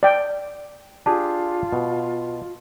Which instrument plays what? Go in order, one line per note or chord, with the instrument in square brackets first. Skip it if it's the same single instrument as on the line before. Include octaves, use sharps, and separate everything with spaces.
[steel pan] D5 G5
[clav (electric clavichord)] D4 G4 G#4 [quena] F4 [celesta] A5
[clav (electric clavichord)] B2